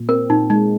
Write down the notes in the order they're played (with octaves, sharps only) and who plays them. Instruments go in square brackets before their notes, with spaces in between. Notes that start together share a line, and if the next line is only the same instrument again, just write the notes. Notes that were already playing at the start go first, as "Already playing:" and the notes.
Already playing: [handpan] A#2
[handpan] C4 [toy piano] A#4
[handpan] A#2 [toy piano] D#4
[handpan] G#3 [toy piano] D#4